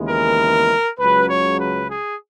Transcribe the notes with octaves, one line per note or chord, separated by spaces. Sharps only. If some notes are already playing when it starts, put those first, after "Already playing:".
Already playing: D#2 C#3 E3 G#3 B3
A#4
C#2 C#3 F#3 B4
C#5
B4
G#4